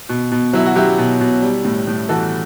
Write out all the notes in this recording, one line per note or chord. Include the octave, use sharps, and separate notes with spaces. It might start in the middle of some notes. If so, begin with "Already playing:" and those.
B2
B2
F#3 E4
F#4
F#3 E4 G4
B2
B2
G3
A2
A2
E3 F#4 A4